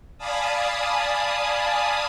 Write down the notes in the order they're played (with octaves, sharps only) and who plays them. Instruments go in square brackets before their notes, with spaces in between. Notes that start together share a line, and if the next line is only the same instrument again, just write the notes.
[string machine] D5 F5 G#5 A5 B5 D#6